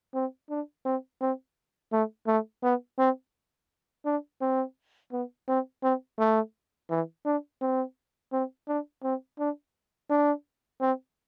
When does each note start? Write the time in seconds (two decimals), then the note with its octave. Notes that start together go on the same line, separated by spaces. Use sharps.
0.14 C4
0.50 D4
0.85 C4
1.21 C4
1.92 A3
2.27 A3
2.63 B3
2.98 C4
4.05 D4
4.41 C4
5.12 B3
5.48 C4
5.83 C4
6.19 A3
6.90 E3
7.25 D4
7.61 C4
8.32 C4
8.68 D4
9.03 C4
9.39 D4
10.10 D4
10.81 C4